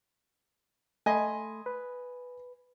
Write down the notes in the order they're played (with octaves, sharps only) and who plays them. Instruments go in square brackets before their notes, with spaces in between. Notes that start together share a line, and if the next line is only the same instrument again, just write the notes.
[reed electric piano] A3 B5 C6 [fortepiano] D#5 G#5
[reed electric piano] B4